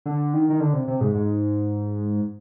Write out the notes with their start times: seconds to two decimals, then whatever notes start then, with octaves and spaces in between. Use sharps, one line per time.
0.06 D3
0.34 D#3
0.50 D#3
0.60 D3
0.73 C3
0.88 C3
1.01 G#2
1.14 G#2